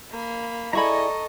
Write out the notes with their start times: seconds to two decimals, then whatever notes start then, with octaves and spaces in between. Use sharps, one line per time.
0.12 A#3 B5
0.73 E4 G#4 A4 D5 D#5 A#5 B5 C#6